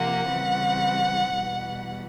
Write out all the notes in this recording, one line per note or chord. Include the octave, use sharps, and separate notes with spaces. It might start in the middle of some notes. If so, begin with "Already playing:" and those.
Already playing: C3 F3 A#3 F#5
C#3 E3 G3 C4
E2 B2 G3